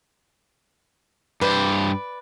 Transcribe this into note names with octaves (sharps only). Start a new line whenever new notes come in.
G2 B4 C5 D5